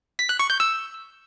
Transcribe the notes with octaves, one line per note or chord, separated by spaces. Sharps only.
B6
F#6
C#6
G6
E6